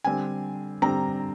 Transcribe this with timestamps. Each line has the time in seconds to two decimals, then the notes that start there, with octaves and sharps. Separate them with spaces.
0.04 D3 G3 C4 G#5
0.82 D3 G3 C4 A#5